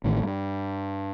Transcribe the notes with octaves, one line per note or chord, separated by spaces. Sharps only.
A1 A2 D#3
G2